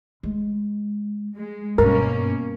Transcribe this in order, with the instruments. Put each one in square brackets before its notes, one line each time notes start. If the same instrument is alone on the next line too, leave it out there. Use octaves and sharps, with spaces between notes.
[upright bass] G#3
[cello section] G#3
[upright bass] G2 [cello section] B2 A#3 C#4 [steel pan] A#4